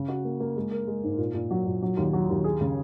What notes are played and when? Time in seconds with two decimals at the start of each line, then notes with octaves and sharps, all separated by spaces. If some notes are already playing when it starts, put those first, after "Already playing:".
Already playing: C#3
0.08 F#4
0.25 A#3
0.40 A#3
0.56 G#3
0.71 A#4
0.87 G#3
1.04 G#2
1.18 A#2
1.34 A#2
1.51 F#3
1.67 A#2
1.82 F#3
1.97 D#2
2.13 F#3
2.30 D#2
2.44 G#4
2.61 C#3